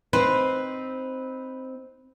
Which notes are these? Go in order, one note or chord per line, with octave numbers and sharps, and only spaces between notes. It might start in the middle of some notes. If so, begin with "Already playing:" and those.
C4 D#4 B4 C5